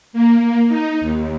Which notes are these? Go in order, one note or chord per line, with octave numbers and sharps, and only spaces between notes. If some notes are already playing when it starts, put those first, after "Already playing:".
A#3
D#4
D#2